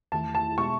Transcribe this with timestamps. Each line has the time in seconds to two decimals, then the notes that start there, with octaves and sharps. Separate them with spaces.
0.12 E2 D#3 A3 E4 A5
0.35 A5
0.57 B2 G#3 B3 C#6